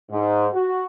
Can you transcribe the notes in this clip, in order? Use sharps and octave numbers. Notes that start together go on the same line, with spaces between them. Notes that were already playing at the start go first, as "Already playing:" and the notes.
G#2
F#4